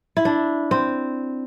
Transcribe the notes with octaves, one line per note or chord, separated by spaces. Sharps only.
E4
D4
C4